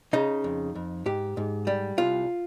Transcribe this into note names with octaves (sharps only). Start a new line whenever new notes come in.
C#3 D#4
F2
F2
G#2 G4
G#2
G3
C2 F4